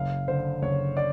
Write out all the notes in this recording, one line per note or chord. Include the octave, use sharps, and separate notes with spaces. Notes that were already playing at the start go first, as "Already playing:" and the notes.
Already playing: F#1 F5
D3 C5
F#1 C#5
D5